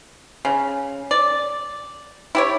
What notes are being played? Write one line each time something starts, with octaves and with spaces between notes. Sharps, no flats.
C#3
D5
E4 G4 C#5